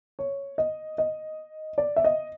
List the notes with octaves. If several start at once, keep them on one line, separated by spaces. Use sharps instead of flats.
C#5
D#5
D#5
D5
E5
D#5